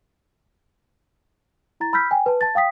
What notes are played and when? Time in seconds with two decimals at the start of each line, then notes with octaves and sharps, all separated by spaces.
1.80 E4 A#5 A6
1.93 B5 E6 F6 G6 B6
2.11 G5 G#5
2.26 B4 A5
2.41 A5 A6
2.55 F5 G5 D#6 B6